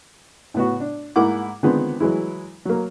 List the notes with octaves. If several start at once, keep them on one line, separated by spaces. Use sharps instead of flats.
A2 B3 F#4
D4
G#2 A#3 E4 F#5 D6
D3 D#3 F3 G#3 B3 C4
E3 F#3 G#3 E4
F#3 A#3